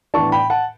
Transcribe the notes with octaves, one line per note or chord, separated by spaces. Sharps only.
A2 E3 B3 D4 A5 C#6
G5 B5
F#5 A5